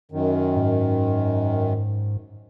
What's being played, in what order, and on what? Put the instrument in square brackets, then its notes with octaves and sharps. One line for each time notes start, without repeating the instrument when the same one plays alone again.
[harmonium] F#2 D#3
[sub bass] G#2